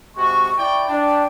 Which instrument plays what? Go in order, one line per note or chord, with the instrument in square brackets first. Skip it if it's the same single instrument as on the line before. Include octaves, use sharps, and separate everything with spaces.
[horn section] C3 G#3 F#4 [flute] C#6
[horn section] E4 D5 G5
[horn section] D4 [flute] G5